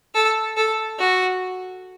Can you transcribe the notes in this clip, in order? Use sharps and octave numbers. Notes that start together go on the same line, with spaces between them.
A4
A4
F#4